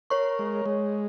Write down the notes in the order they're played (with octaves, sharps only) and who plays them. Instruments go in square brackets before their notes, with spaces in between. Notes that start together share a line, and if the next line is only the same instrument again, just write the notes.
[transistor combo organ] A#4 [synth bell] C#5 C#6
[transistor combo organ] G#3
G#3